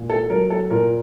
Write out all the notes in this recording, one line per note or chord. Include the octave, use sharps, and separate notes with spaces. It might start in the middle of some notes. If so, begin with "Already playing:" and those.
Already playing: A#2
A4
F#3 A#4
A4
A#2 A#4